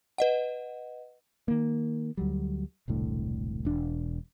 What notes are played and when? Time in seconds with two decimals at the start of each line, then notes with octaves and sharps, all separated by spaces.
0.18 B4 D#5 F#5
1.48 D#3 A#3
2.17 D2 F#3 G3
2.88 E1 C2 A2 D3
3.65 E1 D4